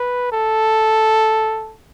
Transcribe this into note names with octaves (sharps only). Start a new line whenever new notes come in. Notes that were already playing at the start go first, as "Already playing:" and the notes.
Already playing: B4
A4